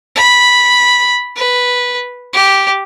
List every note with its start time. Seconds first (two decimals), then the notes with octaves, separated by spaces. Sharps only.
0.16 B5
1.36 B4
2.33 G4